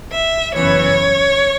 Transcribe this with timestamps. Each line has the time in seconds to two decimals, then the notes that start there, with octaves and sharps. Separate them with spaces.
0.12 E5
0.54 F#2 C#3 E3 B3 C#5